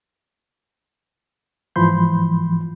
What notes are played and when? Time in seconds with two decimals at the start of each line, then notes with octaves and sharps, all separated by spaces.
1.76 G#2 E3 F3 B5 C6 G6